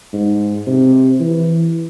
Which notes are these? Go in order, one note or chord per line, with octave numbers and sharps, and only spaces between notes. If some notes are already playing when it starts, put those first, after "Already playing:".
G#2
C3
E3